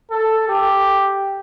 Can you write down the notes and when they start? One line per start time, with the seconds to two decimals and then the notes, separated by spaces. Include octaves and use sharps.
0.11 A4
0.48 G4